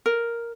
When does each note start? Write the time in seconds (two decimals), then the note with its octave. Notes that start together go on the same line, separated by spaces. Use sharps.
0.06 A#4